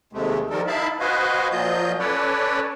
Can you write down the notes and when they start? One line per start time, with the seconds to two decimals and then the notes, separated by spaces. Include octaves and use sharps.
0.13 D#2 C3 G#3 A3
0.50 D#3 F3 G3 A4 A#4
0.67 D#4 E4 E5 F5 A5 B5
1.00 F#4 B4 C5 D#5 F5 G#5
1.51 A#2 F3 F#3 F4 D#5 G6
1.99 C#4 A4 B4 C#5 D5